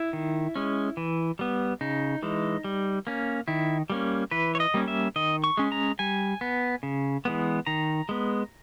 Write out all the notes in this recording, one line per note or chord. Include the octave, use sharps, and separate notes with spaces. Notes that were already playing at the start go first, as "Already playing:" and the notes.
Already playing: E4
D#3
G#3 C#4
E3
G3 B3
C#3 D#4
E3 G#3
G3
A#3 C#4
D#3 E4
G3 A#3 C#4
E3 B4
C#5
D#5
G3 A#3 C#4
E5
D#3 D#5
C#6
G#3 C#4
A#5
G3 G#5
B3
C#3
E3 G#3 B3
D#3 A#5
G#3 B3